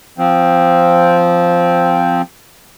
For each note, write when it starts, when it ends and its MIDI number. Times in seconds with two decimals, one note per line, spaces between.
0.18 2.22 53
0.18 2.22 60